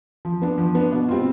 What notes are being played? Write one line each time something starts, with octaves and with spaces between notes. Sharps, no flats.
F3
B3 D4
F3
B3 D4
B2
G3 C4 F4